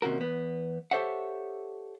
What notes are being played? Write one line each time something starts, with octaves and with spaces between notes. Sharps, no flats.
D#2 C3 C#4 F#4 A#4
E2 B3
G4 A4 C5 C#5 E5 F#5